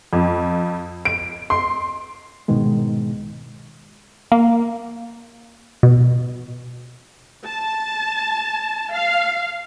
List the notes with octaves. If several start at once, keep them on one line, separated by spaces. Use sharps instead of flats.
F2
D7
C6
C2 G#2 B2 D#3 G#3
A#3
B2
A5
F5